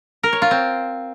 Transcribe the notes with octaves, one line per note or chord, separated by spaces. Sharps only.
A#4
C#5
F4
C4